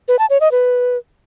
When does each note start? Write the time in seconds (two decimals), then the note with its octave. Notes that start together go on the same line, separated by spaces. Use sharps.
0.08 B4
0.19 A5
0.30 C#5
0.41 D#5
0.51 B4